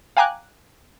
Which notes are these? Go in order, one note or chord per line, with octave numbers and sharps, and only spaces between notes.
F5 G5 G#5 A#5 D6 F#6